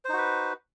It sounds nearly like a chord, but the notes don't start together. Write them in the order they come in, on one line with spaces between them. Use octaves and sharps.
C5 D#4 F#4 B4